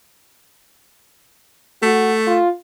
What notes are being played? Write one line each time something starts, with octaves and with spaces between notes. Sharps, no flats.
A3 F#4
F4